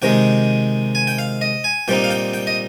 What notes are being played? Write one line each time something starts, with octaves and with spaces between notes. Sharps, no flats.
C3 D#3 G#3 G5
G#5
G5
F5
D#5
G#5
A#2 G3 C4 D#4 G5
F5
G5
G5
D#5